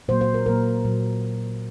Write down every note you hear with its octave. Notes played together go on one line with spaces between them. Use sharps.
A#2 F#3 A#3 C5
C5
A#4
A#2 F#3 A#3 A#4
A#2 F#3 A#3